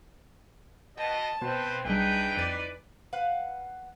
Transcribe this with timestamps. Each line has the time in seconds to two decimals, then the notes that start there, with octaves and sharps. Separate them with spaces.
0.98 B2 D#5 G5 A5
1.42 D#2 B2 C4 B4 C5
1.85 B1 E3 G3 D4 D#4 G#4 B4 G5
2.37 F2 D5 D6 A6
3.13 B4 F5 F#5